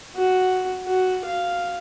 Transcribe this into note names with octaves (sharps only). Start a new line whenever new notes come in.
F#4
F#4
F5